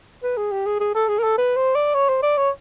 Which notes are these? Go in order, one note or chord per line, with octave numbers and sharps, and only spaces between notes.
B4
G#4
G4
G#4
G#4
A4
G#4
A#4
A4
B4
C5
D5
C#5
C5
D5
C#5